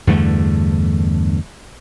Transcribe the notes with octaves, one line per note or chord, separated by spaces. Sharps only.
E2 G2 D3 A3